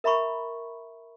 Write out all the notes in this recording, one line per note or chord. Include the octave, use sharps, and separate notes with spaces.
A#4 E5 A#5 B5 C#6